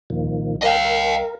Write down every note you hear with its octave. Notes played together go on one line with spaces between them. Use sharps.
D#2 A#2 D#3 F3
C2
A#4 D#5 F5
A#4